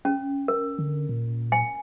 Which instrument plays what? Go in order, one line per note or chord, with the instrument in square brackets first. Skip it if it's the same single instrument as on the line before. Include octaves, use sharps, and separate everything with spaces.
[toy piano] C#4
A#4
[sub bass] D3
A#2
[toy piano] G#5